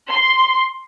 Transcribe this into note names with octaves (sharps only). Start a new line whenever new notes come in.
C6